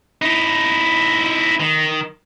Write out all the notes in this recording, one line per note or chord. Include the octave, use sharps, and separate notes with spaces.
D#4 E4
D#3